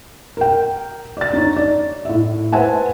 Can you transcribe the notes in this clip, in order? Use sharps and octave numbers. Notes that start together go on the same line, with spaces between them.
A#4 G5
D5 A6
D4 D#4 C#5
D5
A2 E5
B4 C5 E5 F#5 G#5 A5